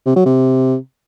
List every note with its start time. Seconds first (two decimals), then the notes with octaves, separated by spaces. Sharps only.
0.06 C3
0.16 F#3
0.26 C3